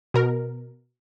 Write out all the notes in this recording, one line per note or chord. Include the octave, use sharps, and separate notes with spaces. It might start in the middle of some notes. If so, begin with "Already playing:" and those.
B2 A#4